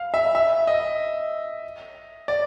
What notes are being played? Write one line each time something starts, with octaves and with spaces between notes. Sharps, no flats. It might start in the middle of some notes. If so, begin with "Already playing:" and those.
Already playing: F5
E5
E5
D#5
D5